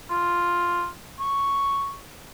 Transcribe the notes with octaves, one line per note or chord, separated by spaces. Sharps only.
F4
C#6